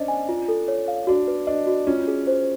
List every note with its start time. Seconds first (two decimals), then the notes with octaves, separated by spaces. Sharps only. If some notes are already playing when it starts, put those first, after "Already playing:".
Already playing: C#4 D4 C5 D#5
0.08 G#5
0.29 F4
0.48 A4
0.68 C#5
0.88 F5
1.07 D4 F#4
1.28 B4
1.47 D4 D#5
1.67 F#4
1.87 C#4 F4
2.08 G#4
2.27 C5